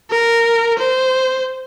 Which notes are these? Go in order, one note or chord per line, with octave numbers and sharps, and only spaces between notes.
A#4
C5